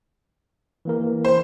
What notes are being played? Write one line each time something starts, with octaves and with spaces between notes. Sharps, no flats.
E3 A#3 A#4
C5